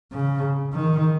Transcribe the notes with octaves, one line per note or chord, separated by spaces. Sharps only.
C#3
D#3